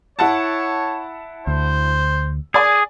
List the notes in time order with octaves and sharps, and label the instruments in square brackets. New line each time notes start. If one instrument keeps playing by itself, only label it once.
[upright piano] E4 F#5 A5 [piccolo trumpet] C#5
[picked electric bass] D2 [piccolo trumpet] C5
[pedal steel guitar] G#4 [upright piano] D5 G#5